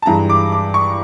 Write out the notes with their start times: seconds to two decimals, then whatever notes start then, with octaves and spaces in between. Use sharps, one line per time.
0.02 A5
0.06 G2 E3 G#3 A#5
0.29 D6
0.52 D6
0.74 C#6